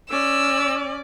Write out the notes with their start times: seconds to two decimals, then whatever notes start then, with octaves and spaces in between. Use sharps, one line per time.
0.10 C#4 D5 E6